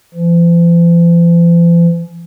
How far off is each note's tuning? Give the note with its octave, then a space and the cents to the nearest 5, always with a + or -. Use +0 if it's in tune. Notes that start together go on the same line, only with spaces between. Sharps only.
F3 -45